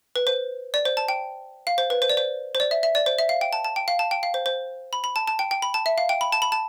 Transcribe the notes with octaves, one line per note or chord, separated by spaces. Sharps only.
B4
C5
D5
C5
A5
G5
F5
C5
B4
C5
D5
C5
C5
D5
E5
E5
D5
C5
E5
F5
G5
A5
A5
G5
F5
A5
G5
F5
C5
C5
B5
B5
A5
A5
G5
G5
B5
A5
E5
F5
G5
B5
A5
B5
A5